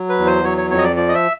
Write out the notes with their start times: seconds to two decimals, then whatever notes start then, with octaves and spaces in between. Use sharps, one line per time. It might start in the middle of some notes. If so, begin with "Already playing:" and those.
Already playing: F#3
0.09 B4
0.18 E2
0.26 C5
0.44 F#3 C#5
0.58 C#5
0.71 F2 C#5
0.78 D#5
0.84 D5
0.96 F3 D5
1.09 D#5
1.14 E5